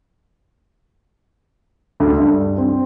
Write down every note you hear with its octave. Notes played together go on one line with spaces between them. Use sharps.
D2
G2
C4